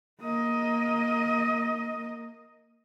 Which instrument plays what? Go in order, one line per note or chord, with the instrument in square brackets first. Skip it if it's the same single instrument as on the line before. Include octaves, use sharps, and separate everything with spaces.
[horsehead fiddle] A#3 D#5